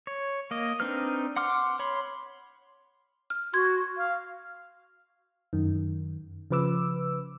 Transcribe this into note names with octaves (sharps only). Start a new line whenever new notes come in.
C#5
A#3 D#5
C4 D4 D#4 B4 F6
F#5 C6 D6 F6
C#5 B5 C6
F6
F#4 C6 G#6
F5
F#2 D#3
C#3 F3 B4 D6 E6